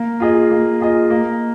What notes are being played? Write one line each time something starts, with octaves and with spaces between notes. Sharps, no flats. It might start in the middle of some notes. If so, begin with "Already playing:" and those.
Already playing: A#3
F4 G#4 D#5
A#3
F4 G#4 D#5
A#3